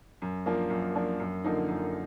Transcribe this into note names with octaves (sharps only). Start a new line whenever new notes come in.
F#2
F3 A#3 D4
F#2
F3 A#3 D4
F#2
D3 F3 A#3 D#4
F#2